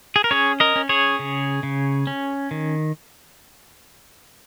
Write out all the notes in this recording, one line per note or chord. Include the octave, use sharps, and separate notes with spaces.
G#4
A#4
C#4 G#4 C#5
A#4 D#5
C#4
G#4 C#5
C#3
C#3
C#4
D#3